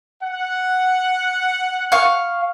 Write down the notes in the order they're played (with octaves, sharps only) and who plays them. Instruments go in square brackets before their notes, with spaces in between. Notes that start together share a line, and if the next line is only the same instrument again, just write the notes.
[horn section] F#5
[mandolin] F5 C#6